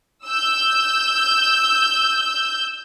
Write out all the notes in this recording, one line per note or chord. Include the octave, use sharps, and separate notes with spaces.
E6 G6